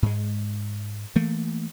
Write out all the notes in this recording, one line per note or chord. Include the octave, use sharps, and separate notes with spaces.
G#2 G#3
E3 A3 A#3